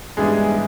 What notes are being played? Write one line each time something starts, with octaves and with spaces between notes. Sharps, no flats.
G#2 E3 G3 G#3 B3 D4 G#4